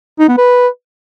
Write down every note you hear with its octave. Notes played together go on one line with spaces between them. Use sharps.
D#4
B3
B4